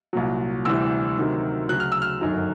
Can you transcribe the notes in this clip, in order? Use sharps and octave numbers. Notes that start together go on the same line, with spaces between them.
C2 A#2 F#3
D2 C3 E3 G3 E6
D2 C3 D#3 F#3
D2 C#3 F#3 F#6
F6
E6
F6
G1 F#2 D#3 F#3